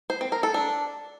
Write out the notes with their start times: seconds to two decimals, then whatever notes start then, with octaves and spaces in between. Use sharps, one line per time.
0.10 C5
0.21 C4
0.32 A#4
0.43 A4
0.54 D4